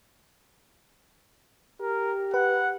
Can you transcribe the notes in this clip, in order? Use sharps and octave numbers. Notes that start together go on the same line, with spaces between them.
G4 A#4
B4 F#5